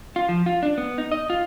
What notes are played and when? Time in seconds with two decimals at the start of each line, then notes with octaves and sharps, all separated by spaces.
0.16 F4
0.29 F3
0.46 F4
0.63 D4
0.78 B3
0.98 D#4
1.12 D#5
1.30 F4